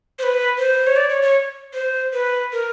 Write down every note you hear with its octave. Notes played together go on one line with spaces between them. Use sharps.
C5
B4
C5
C#5
D5
C#5
C#5
C5
B4
A#4